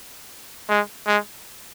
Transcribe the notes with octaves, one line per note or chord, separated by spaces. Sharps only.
G#3
G#3